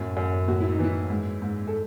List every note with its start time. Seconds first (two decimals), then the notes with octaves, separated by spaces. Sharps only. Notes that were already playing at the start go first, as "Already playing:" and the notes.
Already playing: F#2 A2
0.17 F#2
0.48 A2 F#4
0.61 E4
0.72 D#4
0.79 E3 E4
1.10 G#2
1.42 G#2
1.68 A4